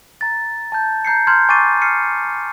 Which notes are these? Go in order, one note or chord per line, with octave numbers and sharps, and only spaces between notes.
A#5 A6
A5 G6
A#5 G6 C7 C#7
A#5 C6 F6 G6 G#6
G#5 C#6 D6 A6 C7 D#7
F6 C7 C#7 D#7